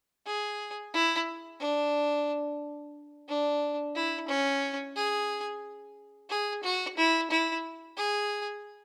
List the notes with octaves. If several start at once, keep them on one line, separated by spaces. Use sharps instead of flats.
G#4
E4
D4
D4
E4
C#4
G#4
G#4
F#4
E4
E4
G#4